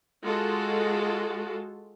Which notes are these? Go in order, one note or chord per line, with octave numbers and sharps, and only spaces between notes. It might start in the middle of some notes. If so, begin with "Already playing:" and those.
G#3 F4 F#4 A4